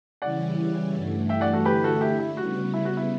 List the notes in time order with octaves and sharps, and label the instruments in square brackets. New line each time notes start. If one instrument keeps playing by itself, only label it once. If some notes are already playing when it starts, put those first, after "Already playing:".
[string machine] C#3 E3 G3 C#4 E4 [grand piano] D5 F#5
[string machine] G2 E3 A3
[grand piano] E5 G5
D5 F#5
F#4 A4
[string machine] D3 A3 E4 [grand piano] G4 B4
[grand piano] F#4 A4
E4 G4
E4
[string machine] C#3 G3 B3 [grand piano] F#4
[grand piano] E4
F#4
E4